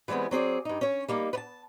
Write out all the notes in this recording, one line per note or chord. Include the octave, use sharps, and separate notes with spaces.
E3 G3 G#3 B3 C4
F#3 C4 G#4 D5
G2 D#4
C#4 C#5
G3 A#3 D#4
B4 A5